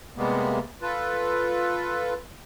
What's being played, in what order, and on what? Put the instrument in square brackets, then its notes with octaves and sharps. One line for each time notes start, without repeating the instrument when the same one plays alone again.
[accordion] C3 G3 G#3 A#3 B3
F4 A4 B4